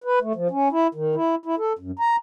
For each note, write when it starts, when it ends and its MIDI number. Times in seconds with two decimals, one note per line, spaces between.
0.04 0.19 71
0.22 0.33 57
0.35 0.48 53
0.51 0.68 61
0.72 0.87 64
0.95 1.15 51
1.15 1.35 64
1.46 1.55 64
1.58 1.73 69
1.79 1.91 42
1.99 2.16 82